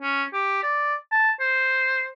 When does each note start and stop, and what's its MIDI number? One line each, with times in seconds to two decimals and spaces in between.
0.02 0.24 61
0.33 0.61 67
0.63 0.95 74
1.12 1.32 81
1.40 2.08 72